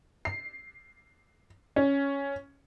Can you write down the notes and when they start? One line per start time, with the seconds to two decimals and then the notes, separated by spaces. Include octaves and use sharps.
0.25 C7
1.76 C#4